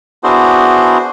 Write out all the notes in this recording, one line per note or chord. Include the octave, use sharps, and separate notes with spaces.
B3 D4 E4 F#4 G#4 C5